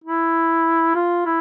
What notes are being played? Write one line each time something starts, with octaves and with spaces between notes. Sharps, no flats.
E4
F4
E4